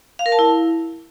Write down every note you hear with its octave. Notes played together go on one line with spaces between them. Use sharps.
F5
A#4
A5
E4